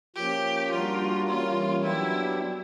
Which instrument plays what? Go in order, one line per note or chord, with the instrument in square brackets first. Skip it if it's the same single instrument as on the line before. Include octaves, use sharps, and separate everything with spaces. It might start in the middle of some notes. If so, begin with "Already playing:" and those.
[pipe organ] F3 A#3 C#4 [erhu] G4
[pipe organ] G3 A#3 D4 F#4 A#4 [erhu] F4
[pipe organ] E3 G3 A#3 C#4 [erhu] F4
[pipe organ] F#3 B3 D4 G4 [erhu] E4